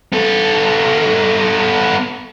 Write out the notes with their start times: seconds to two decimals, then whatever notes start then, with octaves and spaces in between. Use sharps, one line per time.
0.13 B3 A4